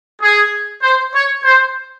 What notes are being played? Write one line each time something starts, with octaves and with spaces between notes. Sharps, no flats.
G#4
C5
C#5
C5